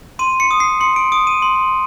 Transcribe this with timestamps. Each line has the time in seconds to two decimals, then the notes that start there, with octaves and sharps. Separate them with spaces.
0.19 C6 D#7
0.40 C#7
0.51 D#6
0.60 C7
0.80 C6 C#7
0.96 D7
1.12 D#6 D7
1.27 D#7
1.42 C6